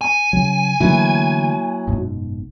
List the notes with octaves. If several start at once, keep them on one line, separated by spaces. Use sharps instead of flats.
G#5
C#3 F#3
D3 E3 F#3 A3 A#3 E4
F#1 G#2 B2